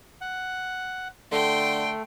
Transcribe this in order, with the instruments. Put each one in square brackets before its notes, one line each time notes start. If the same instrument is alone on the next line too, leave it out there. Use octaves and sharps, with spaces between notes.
[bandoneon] F#5
[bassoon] D3 [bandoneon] A3 [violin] G5 C6